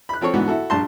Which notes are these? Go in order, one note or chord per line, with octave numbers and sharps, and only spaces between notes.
B5 F#6
F3 C4 A4 C#5
G#2 D3 E3 B3 F#4
E4 F#4 A4
A#1 G2 A5 C6